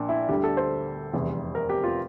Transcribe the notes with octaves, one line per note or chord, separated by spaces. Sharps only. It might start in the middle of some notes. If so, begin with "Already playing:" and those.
Already playing: A#1 A#2 D4
E4
D2 D3 G3 G4
A4
C5
F1 E2 C3 E3 G3
A#4
G4
F4